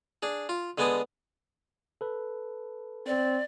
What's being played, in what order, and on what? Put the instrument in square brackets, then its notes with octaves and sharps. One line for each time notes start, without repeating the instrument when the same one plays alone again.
[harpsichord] D4 G#4
F4
D3 G#3 B3 G#5 A5 D#6
[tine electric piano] A4 B4
[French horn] C4 [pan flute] D5